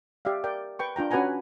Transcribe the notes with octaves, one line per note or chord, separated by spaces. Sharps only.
G4 D5 E5 F5
A#4 D5 G5
B4 G5 C#6
D4 F4 G5 A#5
C#4 F#4 B4 F#5 G#5 A#5